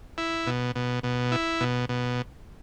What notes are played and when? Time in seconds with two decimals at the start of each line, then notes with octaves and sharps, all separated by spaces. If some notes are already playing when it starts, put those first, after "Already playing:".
0.18 E4
0.47 B2
0.76 B2
1.03 B2
1.32 E4
1.61 B2
1.89 B2